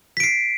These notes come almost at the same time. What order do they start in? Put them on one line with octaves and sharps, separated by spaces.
B6 D7 C7